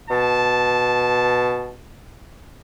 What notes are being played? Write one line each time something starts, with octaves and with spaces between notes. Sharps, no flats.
B2 A5